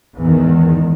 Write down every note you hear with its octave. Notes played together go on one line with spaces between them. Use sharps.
E2 G#2 D#3